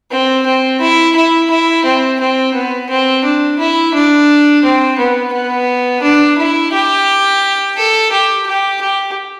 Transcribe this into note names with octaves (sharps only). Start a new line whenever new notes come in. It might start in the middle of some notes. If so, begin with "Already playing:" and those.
C4
C4
E4
E4
E4
C4
C4
B3
C4
D4
E4
D4
C4
B3
B3
D4
E4
G4
A4
G4
G4
G4